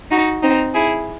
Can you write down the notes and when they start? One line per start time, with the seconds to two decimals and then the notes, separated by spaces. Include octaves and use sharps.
0.11 D#4 F#4
0.42 C4 D#4
0.73 E4 G#4